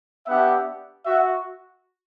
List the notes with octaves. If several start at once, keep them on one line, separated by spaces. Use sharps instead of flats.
B3 D4 G4 E5 F#5
F#4 E5 F#5